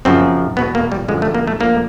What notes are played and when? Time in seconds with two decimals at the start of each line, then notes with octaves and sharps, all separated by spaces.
0.05 F#2 C#3 F3 C4
0.57 E2 B2 B3
0.75 A#3
0.92 G3
1.08 F#2 D3 F3 G#3
1.22 A3
1.35 A#3
1.47 A3
1.60 D2 D3 F3 A#3